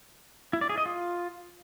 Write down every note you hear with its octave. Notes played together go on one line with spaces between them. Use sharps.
E4
D5
G#4
D#5
F4